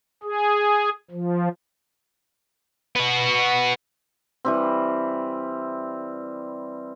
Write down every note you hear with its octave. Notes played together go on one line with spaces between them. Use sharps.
G#4
F3
B3 F#4
E3 G3 C4